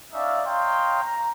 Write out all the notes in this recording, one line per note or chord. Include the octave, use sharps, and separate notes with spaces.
C#4 D#4 D5 E5 F5
C#5 D#5 F5 G5 A#5 C6
A#5